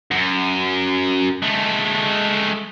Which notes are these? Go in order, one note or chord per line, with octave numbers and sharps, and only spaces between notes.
F#2
G#3 A3